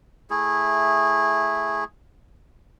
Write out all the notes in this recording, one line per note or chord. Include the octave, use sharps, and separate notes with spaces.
A3 E4 G#4